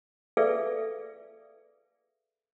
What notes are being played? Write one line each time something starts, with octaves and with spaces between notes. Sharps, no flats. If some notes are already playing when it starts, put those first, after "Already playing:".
G#4 A4 B4 D5 E5 F5